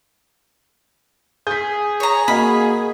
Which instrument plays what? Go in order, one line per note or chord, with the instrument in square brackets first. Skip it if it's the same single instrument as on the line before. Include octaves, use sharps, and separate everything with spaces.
[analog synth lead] G#4 [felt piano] G6 B6
[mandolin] C#5 A#5
[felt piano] A#3 F#4 D#5 [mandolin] B5